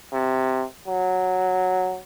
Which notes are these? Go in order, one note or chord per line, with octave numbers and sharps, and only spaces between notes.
C3
F#3